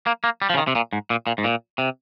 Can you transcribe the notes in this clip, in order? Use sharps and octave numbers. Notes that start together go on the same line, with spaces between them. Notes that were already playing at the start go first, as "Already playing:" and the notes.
A#3
A#3
G3
F3
C#3
D#3
C3
A#2
G#2
A#2
A#2
G#2
A#2
C3